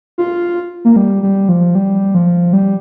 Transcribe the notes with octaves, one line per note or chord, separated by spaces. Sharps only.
F4
A#3
G3
G3
F3
G3
F3
G3